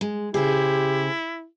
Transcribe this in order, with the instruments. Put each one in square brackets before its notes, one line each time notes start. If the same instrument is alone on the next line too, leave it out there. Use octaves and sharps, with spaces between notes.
[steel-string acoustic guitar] G#3
[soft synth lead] C#3 [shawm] E4 [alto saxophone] G4 [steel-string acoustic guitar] G#4 C5